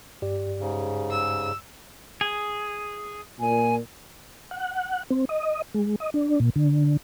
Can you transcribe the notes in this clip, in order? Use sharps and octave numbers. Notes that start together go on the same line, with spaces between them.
G2 G4 D5
G#2 C#3
E6
G#4
A#2 G#5
F#5
C4
D#5
G#3
D#5
D4
A#2
D3